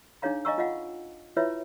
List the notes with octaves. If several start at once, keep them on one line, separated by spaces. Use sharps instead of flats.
D4 D#4 G#4 C#5 F5 A#5
D#5 F5 G#5 A#5 C#6 E6
F4 D#5 F5 F#5
E4 F4 B4 C#5 E5